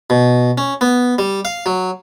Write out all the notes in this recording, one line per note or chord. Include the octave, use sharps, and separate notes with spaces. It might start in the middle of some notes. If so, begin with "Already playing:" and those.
B2
C#4
B3
G3
F5
F#3